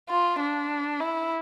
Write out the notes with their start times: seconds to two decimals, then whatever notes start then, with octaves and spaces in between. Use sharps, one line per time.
0.10 F4
0.40 D4
1.00 E4